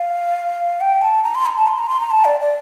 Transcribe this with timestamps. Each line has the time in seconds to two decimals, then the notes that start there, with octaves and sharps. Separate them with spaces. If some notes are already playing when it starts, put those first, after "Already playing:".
Already playing: F5
0.81 G5
1.01 A5
1.23 A#5
1.35 C6
1.46 A#5
1.56 A5
1.67 C6
1.78 A#5
1.89 C6
2.00 A#5
2.11 A5
2.25 D5
2.40 D5